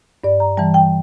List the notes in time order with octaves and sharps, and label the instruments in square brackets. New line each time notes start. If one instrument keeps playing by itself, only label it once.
[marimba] G2 D5
A#5
E3 G3 A5
G5